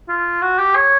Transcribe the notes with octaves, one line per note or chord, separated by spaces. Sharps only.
F4
F#4
G4
C#5